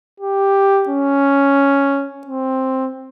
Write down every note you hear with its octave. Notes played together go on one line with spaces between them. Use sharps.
G4
C#4
C4